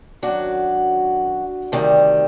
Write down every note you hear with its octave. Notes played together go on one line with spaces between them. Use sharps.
F#2 D#3 F#3 D4 F#4
D2 C3 D#3 G3